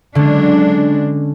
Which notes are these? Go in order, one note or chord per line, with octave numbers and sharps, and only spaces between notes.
D3 F#3 G#3 C#4 D4